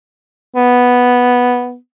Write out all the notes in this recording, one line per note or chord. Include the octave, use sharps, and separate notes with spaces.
B3